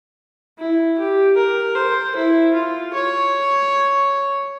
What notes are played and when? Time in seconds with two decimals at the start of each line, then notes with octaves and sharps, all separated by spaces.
0.59 E4
0.98 G4
1.37 A#4
1.75 C5
2.15 E4
2.54 F4
2.94 C#5